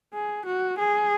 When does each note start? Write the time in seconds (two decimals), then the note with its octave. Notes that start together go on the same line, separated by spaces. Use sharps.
0.14 G#4
0.46 F#4
0.78 G#4